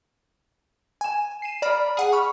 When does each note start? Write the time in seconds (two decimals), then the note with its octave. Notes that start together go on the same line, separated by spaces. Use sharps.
1.01 G#5 E7
1.42 C7 D#7 E7
1.62 D5 A#5 B5 F6
1.97 G#4 F#5
2.12 B5 C#6 F6